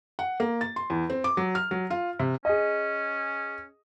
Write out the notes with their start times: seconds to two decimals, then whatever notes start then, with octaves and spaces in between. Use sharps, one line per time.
0.19 F#5
0.40 A#3
0.61 A6
0.76 C6
0.90 E2
1.10 C4
1.24 D6
1.37 F#3
1.55 F6
1.71 F#3
1.90 F4
2.20 C3
2.45 C#4 G#4 D#5